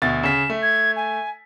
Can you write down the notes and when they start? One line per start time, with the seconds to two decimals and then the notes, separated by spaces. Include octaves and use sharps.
0.02 D2 B2 A6
0.23 C#3 B6 E7
0.50 A3
0.62 G#6
0.96 G#5